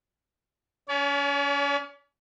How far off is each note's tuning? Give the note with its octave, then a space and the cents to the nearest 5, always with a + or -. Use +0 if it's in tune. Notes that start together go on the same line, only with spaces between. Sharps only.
C#4 +30 D5 -45